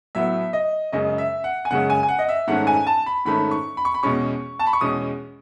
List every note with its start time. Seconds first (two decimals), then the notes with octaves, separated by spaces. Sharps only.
0.15 A2 F#3 B3 E5
0.53 D#5
0.92 F#2 C#3 G#3 C#4 D#5
1.18 E5
1.44 F#5
1.65 G#5
1.70 F#2 C#3 G#3 C#4 F#5
1.90 G#5
2.03 G#5
2.08 F#5
2.19 D#5
2.29 E5
2.47 G#2 D#3 A3 C#4 F#5
2.67 G#5
2.87 A5
3.06 B5
3.25 G#2 D#3 A3 C#4 B5
3.51 C#6
3.77 B5
3.85 C#6
3.94 B5
4.03 E2 B2 G#3 C#4 C#6
4.59 A5
4.67 B5
4.73 C#6
4.81 E2 B2 G#3 C#4 D#6